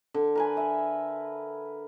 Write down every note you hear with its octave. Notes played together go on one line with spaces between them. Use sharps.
D3
A#4 B4 G#5
E5